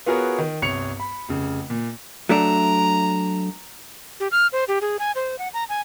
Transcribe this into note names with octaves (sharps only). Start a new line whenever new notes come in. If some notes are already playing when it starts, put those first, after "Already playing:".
B3 F4 F#4 G#4 A#4 C#5
D#3
G1 C2 C#5 C#7 F7
B5
F1 C#3
A#2
F#3 A3 D4 A#5
G4
F6
C5
G4
G#4
G#5
C5
F#5
A#5
G#5